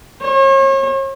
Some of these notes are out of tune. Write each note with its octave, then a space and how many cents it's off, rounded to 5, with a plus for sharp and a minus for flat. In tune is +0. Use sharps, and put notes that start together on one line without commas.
C#5 -40